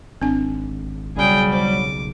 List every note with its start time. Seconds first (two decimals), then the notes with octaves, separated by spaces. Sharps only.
0.22 G#1 C4 D4 G#5
1.16 B1 C#3 F#3 G3 G#4 G5
1.53 C5 D6